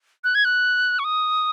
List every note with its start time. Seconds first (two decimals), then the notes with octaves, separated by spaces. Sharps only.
0.24 F#6
0.35 G#6
0.45 F#6
0.99 C#6
1.04 D#6